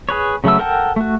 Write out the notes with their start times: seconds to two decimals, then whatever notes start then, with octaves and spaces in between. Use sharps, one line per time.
0.09 G#4 B4 C#5
0.44 C#3 F#3 A3 B3 E6
0.59 A4 A#4 F#5 G5 A5
0.96 A3 F#4